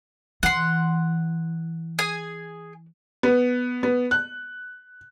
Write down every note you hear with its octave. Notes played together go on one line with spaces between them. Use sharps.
E3 F#5 C6
G#4 G#5
B3
B3
F#6